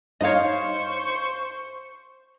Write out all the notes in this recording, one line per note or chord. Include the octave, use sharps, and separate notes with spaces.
G2 D#4 C5 C#5 D#5 F5 C#6